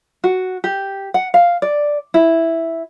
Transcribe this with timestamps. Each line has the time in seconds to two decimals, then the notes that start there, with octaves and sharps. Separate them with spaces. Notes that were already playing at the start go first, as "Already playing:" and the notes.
0.24 F#4
0.64 G4
1.14 F#5
1.34 F5
1.62 D5
2.14 E4